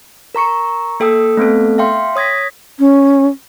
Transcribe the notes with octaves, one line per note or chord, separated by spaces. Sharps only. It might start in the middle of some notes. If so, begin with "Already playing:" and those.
A#4 A#5 C#6 C#7
A#3 A4 G5 D#6 E6
A3 B3 C4 A4
E5 F5 G5 C6
C#5 D#6 G#6 A#6 B6
C#4